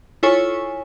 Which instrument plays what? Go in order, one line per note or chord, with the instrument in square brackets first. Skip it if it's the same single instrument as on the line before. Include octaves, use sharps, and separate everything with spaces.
[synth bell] E4 F4 A4 C#5 G#5 C#6